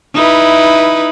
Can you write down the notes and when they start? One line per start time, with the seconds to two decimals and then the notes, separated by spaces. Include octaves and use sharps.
0.15 D#4 E4 B4